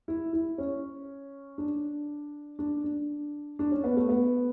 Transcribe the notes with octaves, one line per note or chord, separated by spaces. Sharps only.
E4
E4
C#4
D4
D4
D4
D4
C#4
B3
A3
B3